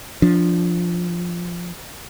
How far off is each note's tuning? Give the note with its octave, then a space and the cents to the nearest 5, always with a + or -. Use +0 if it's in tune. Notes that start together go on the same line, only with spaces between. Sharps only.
F3 +0 D4 +0